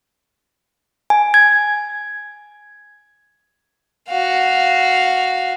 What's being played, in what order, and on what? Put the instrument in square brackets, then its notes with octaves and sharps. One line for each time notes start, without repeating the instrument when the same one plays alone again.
[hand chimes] G#5
G#6
[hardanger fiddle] F#4 F5